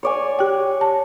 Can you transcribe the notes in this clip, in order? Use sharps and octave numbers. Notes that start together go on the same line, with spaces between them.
C#5 D5 G#5
G4 G5
A5